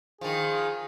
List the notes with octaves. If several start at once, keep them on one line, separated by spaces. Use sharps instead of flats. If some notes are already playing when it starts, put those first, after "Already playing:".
D#3 F3 G#4